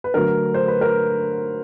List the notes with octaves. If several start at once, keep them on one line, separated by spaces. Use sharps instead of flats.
B4
D3 F#3 A3 A#4
C5
B4
A#4